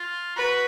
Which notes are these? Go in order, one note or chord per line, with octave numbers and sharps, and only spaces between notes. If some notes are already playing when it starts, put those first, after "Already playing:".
Already playing: F4
F#4 B4